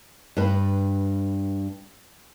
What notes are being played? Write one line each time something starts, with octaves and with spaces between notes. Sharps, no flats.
G2 B4